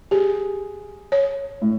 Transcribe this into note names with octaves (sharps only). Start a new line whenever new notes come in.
G4 G#4
C#5
A2